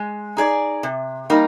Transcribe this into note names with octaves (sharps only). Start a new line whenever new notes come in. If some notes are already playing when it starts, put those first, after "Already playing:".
Already playing: G#3
D#4 G#4 D5
C3
G3 A#3 D#4